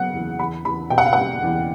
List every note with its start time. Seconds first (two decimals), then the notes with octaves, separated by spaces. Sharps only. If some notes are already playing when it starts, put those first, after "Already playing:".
Already playing: C#3 F#3 B3 F#5
0.13 E2
0.39 E2 B5
0.65 E2 B5
0.90 B2 G5
0.98 F#5
1.06 F5
1.13 G3 F#5
1.43 E2